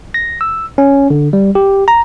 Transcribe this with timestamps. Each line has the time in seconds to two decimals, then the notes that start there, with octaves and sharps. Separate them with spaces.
0.14 A#6
0.41 E6
0.78 C#4
1.10 D3
1.33 G3
1.55 G4
1.88 A#5